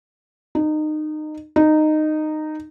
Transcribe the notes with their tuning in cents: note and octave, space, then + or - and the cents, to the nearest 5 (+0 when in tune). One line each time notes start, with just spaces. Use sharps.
D#4 -25
D#4 -15